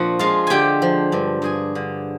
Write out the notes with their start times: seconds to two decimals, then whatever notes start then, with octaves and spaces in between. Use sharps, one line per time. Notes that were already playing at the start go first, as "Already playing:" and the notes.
Already playing: A#2 F3 C4 D4 F#4 F#5
0.19 G#3 F4 F5
0.47 D3 G4 G5 G#5
0.82 F3
1.12 G2
1.42 G2 G#4 G#5
1.75 D3